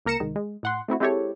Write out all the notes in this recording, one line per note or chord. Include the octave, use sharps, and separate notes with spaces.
C#2 A#3 A#4 A#6 C#7 E7
C2 G#2 D#3
G#3
A2 F#5 C6
A3 C4 E4 F#4
G#3 C4 E4 G4 A4 C#5